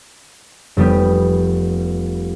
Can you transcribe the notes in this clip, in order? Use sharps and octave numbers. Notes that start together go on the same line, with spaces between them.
F1 G3 B3 G4